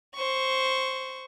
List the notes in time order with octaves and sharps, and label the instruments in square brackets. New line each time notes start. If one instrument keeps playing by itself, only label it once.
[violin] C5 C#6